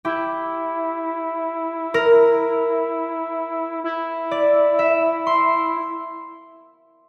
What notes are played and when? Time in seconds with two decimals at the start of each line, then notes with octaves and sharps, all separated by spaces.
0.05 E4 G4
1.94 A#4
3.84 E4
4.31 D5
4.79 E5
5.27 C6